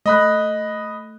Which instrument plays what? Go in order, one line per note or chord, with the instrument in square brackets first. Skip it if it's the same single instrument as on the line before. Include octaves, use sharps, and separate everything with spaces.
[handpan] A3 [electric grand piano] D#5 B5 F#6